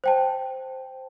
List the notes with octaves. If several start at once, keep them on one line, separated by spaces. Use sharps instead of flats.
C5 G5 A5